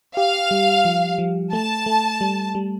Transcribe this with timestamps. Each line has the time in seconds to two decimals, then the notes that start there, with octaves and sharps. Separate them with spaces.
0.17 G4 F5
0.51 G3
0.85 F3
1.18 F3
1.52 A3 A5
1.86 A3
2.21 G3
2.55 G3